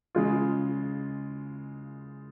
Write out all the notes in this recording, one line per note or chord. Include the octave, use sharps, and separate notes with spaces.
C#3 G#3 F4